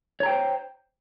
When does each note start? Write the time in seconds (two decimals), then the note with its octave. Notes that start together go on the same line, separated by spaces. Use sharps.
0.20 C#5
0.23 A#5
0.26 G5
0.29 C5